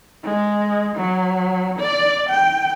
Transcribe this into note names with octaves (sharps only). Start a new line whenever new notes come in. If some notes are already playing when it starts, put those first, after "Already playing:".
G#3
F#3
D5
G5